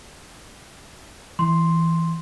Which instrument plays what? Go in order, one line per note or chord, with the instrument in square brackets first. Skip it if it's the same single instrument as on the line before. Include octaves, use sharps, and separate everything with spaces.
[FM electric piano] E3 [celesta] C6